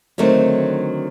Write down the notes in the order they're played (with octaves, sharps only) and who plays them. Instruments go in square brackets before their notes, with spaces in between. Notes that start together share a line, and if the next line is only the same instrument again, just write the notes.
[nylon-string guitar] D3 D#3 F#3 A3 C4